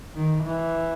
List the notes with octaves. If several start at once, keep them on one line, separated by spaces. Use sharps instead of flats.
D#3
E3